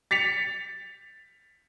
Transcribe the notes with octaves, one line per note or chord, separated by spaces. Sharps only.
A6 B6 C#7 F7